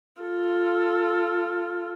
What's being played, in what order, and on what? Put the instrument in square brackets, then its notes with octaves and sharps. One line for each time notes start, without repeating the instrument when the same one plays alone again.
[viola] F4 A4